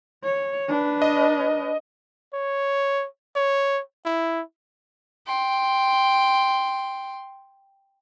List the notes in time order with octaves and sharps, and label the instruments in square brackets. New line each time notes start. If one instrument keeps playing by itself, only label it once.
[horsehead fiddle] C#5
D4 B4
[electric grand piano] D#5
[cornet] C#5
C#5
E4
[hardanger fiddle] G5 C6